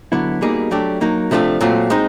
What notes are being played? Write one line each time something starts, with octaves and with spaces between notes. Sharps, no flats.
D3 F#3 B3 E4
B2 G3 A#3 D#4 G#4
F#3 A3 D4 G4
F#3 A#3 D#4
C3 F3 A3 D4 F4
A#2 F#3 A3 C4 F4
G#3 C4 D#4